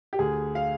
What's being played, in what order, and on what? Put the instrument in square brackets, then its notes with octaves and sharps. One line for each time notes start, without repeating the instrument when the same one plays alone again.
[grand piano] G4
D2 G#4
F5